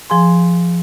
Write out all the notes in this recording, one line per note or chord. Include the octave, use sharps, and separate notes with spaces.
F3 G#4 G#5 C6